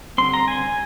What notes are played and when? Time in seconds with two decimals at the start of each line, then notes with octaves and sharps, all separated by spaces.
0.18 D3 G3 C4 C6
0.34 A#5
0.48 G#5